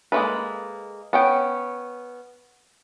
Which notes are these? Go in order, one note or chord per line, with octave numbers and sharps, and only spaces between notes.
G#3 A#3 F4 A4 B4
B3 C#4 G5